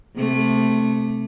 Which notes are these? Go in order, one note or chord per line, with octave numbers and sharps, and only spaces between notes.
C3 A3